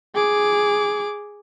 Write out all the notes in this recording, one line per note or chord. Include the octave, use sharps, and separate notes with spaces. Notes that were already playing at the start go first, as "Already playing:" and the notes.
G#4 D6